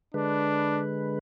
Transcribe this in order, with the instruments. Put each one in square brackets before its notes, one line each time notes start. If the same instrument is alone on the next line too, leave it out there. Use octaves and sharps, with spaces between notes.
[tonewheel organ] D3 G#3 B4 [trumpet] D4